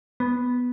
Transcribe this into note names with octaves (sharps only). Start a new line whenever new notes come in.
B3